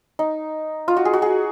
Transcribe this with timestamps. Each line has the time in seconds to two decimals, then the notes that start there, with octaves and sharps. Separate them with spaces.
0.19 D#4
0.88 F4
0.97 F#4
1.05 G#4
1.13 F#4
1.22 G#4